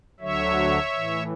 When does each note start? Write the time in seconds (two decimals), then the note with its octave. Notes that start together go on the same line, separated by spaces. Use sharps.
0.20 D2 D3 F#3 C#5 E5
0.94 A2 E3